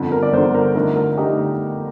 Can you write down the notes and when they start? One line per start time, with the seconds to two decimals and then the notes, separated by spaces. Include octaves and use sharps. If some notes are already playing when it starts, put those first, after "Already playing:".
Already playing: G1 F2 D3
0.12 A#4
0.23 D5
0.33 G1 F2 D3 C5
0.55 A#4
0.75 F2 D3 A3 D#4 A#4
0.95 A#4
1.17 D3 A3 D#4 G4